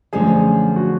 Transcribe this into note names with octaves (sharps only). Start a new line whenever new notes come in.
F#2 D3 F3 A3 C#4 G#4
F#4